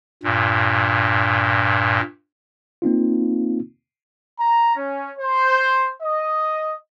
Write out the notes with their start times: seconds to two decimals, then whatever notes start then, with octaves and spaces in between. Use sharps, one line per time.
0.23 G2 A#2
2.82 A#3 C4 D#4 F4
4.37 A#5
4.76 C#4
5.17 C5
6.01 D#5